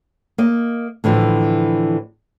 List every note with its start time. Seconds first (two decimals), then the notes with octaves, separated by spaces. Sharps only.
0.38 A#3 D#5
1.04 A2 D3 E3 F3